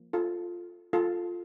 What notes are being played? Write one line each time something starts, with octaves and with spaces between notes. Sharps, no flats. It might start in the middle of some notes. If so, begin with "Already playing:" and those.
Already playing: F3 A#3
F4 A4
F4 A4